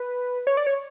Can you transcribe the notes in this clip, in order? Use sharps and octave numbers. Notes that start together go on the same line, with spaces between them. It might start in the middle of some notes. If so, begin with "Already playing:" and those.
Already playing: B4
C#5
D5
C#5